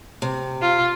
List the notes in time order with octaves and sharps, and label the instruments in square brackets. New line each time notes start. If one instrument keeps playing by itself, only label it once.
[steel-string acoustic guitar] C3
[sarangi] F4